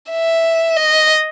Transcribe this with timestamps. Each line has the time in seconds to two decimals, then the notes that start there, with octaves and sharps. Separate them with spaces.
0.11 E5
0.77 D#5